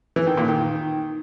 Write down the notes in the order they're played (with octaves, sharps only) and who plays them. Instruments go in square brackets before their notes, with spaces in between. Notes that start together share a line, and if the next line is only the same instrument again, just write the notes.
[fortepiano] E3
D#3
A#2
D#3